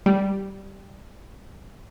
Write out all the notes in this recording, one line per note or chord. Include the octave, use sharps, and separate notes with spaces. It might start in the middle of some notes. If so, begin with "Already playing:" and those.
G3